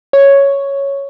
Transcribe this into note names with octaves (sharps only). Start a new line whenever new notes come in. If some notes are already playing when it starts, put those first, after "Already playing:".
C#5